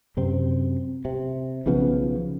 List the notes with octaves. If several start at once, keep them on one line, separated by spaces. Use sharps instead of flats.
F#2 C3 C4
C3
B1 C#3 F3 B3